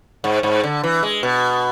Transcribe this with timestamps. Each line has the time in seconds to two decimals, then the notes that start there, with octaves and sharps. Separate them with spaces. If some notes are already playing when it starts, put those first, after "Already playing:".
0.24 G#2
0.43 G#2
0.63 D3
0.83 E3
1.03 G#3
1.23 B2